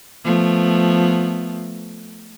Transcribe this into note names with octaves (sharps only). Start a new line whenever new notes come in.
F3 A3 B3